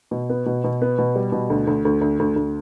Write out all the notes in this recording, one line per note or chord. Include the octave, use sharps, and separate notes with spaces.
B2
B3
B2
B2
B3
B2
G3
B2
D2
D2
D2
D2
D2
D2